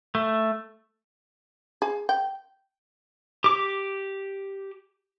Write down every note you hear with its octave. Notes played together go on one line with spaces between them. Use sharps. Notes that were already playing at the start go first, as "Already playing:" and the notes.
A3
G#4
G5
G4 D6